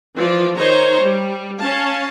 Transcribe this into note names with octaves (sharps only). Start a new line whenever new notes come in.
E3 F3 D5
D#3 D#4 C5 C#5 A#5
G3
C#4 F5 A5